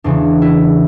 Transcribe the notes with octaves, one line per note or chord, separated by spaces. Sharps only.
E2 C#3 E3 D4
E4